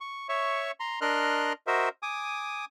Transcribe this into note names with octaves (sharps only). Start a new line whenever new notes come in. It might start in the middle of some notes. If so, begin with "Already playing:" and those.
C#6
C#5 E5 C#6
A#5 C6
D4 A#4 D#5 C6 F6 F#6
F#4 A#4 C5 D#5 E5
G#5 D6 D#6